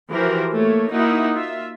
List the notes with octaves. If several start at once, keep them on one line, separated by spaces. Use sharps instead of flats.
E3 F3 F#4 G4 A#4 C5
A3 A#3 C#5
A#3 D#4 E4 F#4 E5 F#5
F4 E5